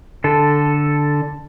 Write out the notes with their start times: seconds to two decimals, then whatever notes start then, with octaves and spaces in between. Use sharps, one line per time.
0.24 D3 A4